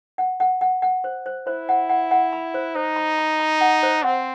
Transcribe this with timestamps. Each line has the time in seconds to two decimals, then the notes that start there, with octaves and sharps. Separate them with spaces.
0.18 F#5
0.40 F#5
0.61 F#5
0.82 F#5
1.04 C5
1.26 C5
1.47 E4 C5
1.69 F#5
1.89 F#5
2.11 F#5
2.33 B5
2.54 C5
2.75 D#4 C5
2.96 B5
3.18 B5
3.40 B5
3.61 F#5
3.83 C5
4.03 C4 F#5